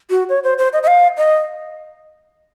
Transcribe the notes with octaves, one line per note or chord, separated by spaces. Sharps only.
F#4
C#5
C5
C5
D#5
D#5
F5
D#5